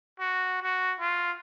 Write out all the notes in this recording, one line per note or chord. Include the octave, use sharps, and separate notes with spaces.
F#4
F#4
F4